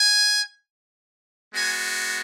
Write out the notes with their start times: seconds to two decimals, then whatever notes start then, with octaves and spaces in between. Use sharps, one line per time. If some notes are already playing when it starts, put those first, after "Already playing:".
Already playing: G#5
1.52 G#3 B3 F#4 G#5